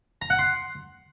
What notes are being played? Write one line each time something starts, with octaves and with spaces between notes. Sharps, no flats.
A#5
F#5
C6